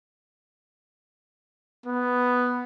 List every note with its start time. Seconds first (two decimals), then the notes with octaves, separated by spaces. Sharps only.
1.86 B3